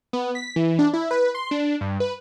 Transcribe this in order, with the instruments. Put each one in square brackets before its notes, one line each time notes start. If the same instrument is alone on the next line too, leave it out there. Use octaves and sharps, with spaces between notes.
[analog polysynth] B3
B6
E3
D4
E4
B4
C6
D4
G2
B4